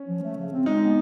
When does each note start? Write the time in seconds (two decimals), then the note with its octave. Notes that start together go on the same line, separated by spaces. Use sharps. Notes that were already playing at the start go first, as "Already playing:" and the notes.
Already playing: C#4
0.08 F3
0.23 A3
0.37 C#3
0.52 C4
0.66 G#3 D#4
0.81 B3